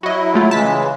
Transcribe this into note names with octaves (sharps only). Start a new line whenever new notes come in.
F#3 E4 F#4 D#5
G#3 A3 F4
C#3 E3 G#3 A5 B6